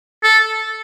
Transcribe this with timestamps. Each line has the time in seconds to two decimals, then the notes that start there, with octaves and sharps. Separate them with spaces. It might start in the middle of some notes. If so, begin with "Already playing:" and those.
0.24 A4